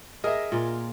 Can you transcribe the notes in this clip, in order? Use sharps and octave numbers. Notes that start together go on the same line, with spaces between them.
G#4 A#4 D#5 E5
A#2 F4